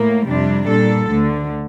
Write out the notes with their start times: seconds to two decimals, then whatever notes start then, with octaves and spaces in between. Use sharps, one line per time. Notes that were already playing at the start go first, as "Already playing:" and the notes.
Already playing: A2 A#3
0.28 F2 C3 G3 D4
0.69 A#2 G3 D4 A4
1.10 D2 D3 A3